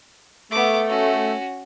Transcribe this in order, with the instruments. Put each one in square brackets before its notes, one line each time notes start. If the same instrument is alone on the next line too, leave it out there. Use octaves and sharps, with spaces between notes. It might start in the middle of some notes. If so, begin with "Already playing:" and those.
[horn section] A3 [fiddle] B3 D6
[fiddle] C#4 F#4